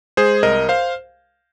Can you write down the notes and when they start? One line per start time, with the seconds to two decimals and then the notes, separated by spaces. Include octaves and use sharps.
0.17 G#3 G#4 C5
0.43 C2 A#4 D#5
0.69 C5 F5